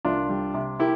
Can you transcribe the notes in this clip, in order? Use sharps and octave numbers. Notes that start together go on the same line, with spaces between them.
C2 D4 F4
G3
C3
A#3 E4 G4